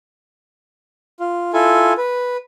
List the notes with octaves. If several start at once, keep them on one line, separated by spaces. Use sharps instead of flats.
F4
E4 F4 A4 G#5
B4